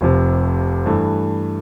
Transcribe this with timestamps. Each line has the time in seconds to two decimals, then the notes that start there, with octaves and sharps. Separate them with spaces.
0.01 F1 F2 C3
0.86 G2 E3 A3